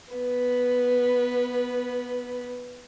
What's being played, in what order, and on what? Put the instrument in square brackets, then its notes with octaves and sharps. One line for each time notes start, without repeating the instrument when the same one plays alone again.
[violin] B3 B4